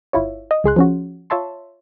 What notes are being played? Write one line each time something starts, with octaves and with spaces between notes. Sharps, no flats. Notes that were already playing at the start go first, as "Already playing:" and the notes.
G1 E4 F4 C#5
D#5
C#2 G#4 C6 F#6
F3 C#4 F#4
F4 C#5 E5 A5 C6